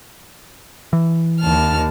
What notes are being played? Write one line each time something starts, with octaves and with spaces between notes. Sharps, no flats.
E3
D#2 A5 F6